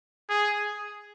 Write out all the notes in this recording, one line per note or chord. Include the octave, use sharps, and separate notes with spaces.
G#4